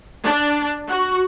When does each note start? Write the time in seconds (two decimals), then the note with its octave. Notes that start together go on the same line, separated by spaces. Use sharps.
0.24 D4
0.90 F#4